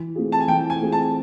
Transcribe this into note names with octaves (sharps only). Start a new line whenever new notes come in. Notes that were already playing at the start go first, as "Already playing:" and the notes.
Already playing: E3
A3 C4 F4 G#4
A5
G#5
E3 G5
G#5
A3 C4 F4 G#4
A5